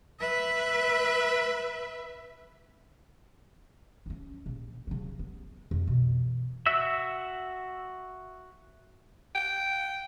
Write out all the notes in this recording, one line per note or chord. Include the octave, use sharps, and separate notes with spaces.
B4 E5
C#4 D#4
A#1
C#3 F#3
B3
F2
B2 E3
F#4 E5 E6
G5